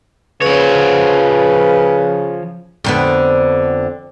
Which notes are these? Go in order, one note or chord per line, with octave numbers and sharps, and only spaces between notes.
C#3 F3 B4 C#5
F2 D3 B3